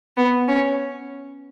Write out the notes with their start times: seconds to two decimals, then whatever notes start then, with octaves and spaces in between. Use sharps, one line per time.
0.17 B3
0.48 C#4